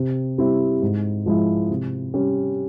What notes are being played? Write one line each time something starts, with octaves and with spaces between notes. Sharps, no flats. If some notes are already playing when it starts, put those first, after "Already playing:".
Already playing: C3
G3 C4 E4
G#2
F3 G#3 E4
C3
G3 C#4